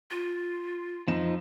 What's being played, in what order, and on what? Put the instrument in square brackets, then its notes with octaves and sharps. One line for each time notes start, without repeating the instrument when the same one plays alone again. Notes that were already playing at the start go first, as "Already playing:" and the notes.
[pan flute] F4
[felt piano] F2 E7 [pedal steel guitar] F3 D#4